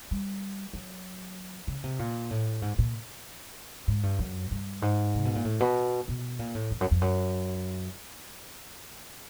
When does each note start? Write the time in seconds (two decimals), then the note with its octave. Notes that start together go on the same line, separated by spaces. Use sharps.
0.11 G3
0.74 F#3
1.68 C#3
1.84 C3
1.99 A#2
2.31 A2
2.62 G#2
2.78 A#2
3.88 G#2
4.03 G2
4.19 F#2
4.51 G2
4.82 G#2
5.15 C3
5.25 B2
5.35 A#2
5.45 A2
5.60 B2
6.08 B2
6.39 A#2
6.55 A2
6.71 F2
6.81 F#2
6.91 F2
7.01 F#2